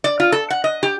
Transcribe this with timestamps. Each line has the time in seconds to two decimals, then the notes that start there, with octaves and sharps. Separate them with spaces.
0.04 D5
0.20 F4
0.32 A4
0.50 F#5
0.64 D#5
0.83 G4